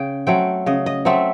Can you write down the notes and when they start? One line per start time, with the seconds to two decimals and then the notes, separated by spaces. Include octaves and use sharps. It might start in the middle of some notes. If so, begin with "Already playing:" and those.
Already playing: C#3 G5
0.27 F#3 A3 C4 G5
0.66 C#3 D#5
0.86 D#5
1.05 F#3 A3 C4 E5